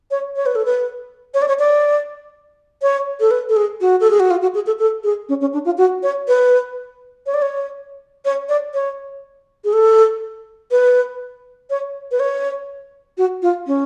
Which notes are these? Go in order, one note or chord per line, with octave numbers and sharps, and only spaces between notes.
C#5
C#5
B4
A4
B4
C#5
D5
C#5
D5
C#5
A4
B4
A4
G#4
F#4
A4
G#4
F#4
F4
F#4
G#4
A4
A4
G#4
C#4
C#4
D4
F4
F#4
C#5
B4
C#5
D5
C#5
C#5
D5
C#5
G#4
A4
B4
C#5
B4
C#5
F#4
F4
C#4